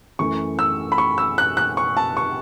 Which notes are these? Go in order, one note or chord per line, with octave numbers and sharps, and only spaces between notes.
F#2 E3 A3 C#6
E6
B5
C#6
E6
F#6
F#6
C#6
A5
C#6